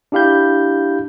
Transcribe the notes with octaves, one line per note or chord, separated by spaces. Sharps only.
D4 E4 G4 F5 B5 G6